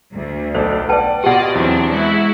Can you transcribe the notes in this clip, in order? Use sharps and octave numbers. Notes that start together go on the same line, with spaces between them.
D2
B1 A4 C5 D5
B4 D5 F#5 G5 A5
B2 F4 G4 D5 D#5 F#5
E2 F#3 C4 D4
G#3 E4 F#4